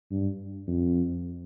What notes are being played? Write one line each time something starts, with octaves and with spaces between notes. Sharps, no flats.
G2
F2